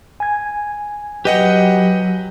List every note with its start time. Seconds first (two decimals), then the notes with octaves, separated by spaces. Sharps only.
0.20 G#5 G#6
1.25 F#3 G4 B4 D#5 F#5 G5